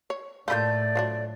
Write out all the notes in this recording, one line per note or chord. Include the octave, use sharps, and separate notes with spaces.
C#5
A2 A3 A#3 F4 D5 B5 G6
F3 F#3 D4